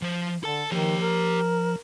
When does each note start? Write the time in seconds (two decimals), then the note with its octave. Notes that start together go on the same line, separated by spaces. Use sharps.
0.02 F3 C5
0.44 D3 A4 A5
0.72 D#3 F3 G4 C#5
1.02 A#4